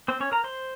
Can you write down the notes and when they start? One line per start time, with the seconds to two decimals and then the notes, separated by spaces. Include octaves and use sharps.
0.08 C4 C5
0.20 C#4 C#5
0.32 A#4 A#5
0.44 C5 C6